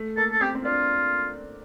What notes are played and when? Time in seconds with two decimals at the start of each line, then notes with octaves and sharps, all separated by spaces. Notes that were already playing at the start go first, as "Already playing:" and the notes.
Already playing: A3
0.17 A#3 A4
0.31 A4
0.41 C4 G4
0.55 C4
0.64 D4 F4